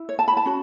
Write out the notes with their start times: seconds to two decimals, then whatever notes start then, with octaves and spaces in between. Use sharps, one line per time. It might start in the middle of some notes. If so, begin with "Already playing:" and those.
Already playing: E4
0.09 C#5
0.19 A5
0.28 B5
0.37 A5
0.46 C#4 F#4